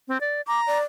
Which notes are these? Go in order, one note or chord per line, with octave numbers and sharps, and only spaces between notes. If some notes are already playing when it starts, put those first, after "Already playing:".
C4
D5
A#5 D6
D5